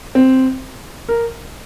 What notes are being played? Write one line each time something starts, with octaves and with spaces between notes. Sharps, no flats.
C4
A#4